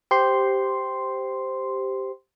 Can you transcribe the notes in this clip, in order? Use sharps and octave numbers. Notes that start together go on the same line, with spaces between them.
G4 C5 C6